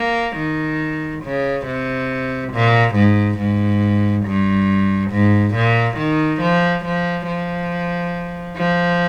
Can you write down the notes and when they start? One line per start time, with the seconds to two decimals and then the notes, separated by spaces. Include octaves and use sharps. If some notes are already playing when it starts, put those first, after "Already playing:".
Already playing: A#3
0.36 D#3
1.23 C#3
1.66 C3
2.53 A#2
2.95 G#2
3.38 G#2
4.26 G2
5.11 G#2
5.55 A#2
5.97 D#3
6.41 F3
6.85 F3
7.27 F3
8.57 F3